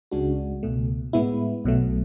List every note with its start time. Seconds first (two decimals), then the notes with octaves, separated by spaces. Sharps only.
0.11 C#2 C#3 G#3 D4 F#4
0.63 C#2 B2 A3
1.13 A2 G#3 B3 E4
1.64 B1 B2 F#3 A3